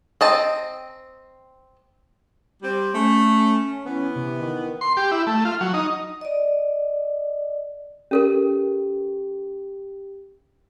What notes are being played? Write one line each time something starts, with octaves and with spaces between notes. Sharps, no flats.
C4 D#5 A5
G3 C4
A3 C#4
E3 B3
C3
D#3
C6
G4
E4
A3
F4
F#3
D#4
D5 D#5
C#4 G4 A4 A#4